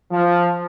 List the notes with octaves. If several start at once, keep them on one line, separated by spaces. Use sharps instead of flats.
F3